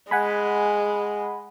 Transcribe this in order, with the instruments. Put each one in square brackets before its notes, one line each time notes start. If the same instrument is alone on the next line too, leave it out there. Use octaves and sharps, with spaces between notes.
[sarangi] G#3 [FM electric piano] F#5 G#5 B5